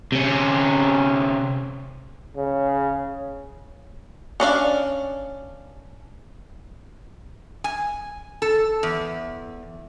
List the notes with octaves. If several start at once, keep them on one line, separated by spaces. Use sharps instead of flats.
C3 C#4
C#3
C#4 D4 D5 F5
G#5
A4
E2